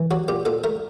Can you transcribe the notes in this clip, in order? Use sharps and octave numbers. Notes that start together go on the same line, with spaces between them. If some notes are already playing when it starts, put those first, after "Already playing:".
Already playing: E3
F#3 F#4
A#2 G4
A#2 A4
A3 A#4